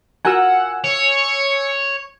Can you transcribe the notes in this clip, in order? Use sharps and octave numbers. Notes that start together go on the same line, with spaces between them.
F4 F#4 A#4 F#5 G#5 E6
C#5 C#7